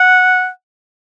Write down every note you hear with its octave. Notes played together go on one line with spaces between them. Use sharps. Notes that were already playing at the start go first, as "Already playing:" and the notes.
Already playing: F#5